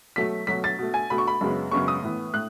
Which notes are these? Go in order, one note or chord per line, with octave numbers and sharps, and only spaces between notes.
B2 F#3 A3 B6
B2 F#3 A3 B6
A6
B2 A3
G#5
B2 A3 B5
C#6
B5
F#2 C#3 G#3 B3
F#2 C#3 G#3 B3 C#6
D#6
A2 E3 B3
A2 F#6